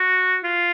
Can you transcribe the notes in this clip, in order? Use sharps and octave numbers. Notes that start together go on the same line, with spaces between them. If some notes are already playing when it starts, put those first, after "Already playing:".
Already playing: F#4
F4